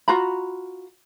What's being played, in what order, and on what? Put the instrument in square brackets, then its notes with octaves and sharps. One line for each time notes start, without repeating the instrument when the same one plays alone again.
[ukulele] F4 F#4 A#5 B5